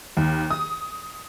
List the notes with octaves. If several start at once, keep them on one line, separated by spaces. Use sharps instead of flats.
D#2
D#6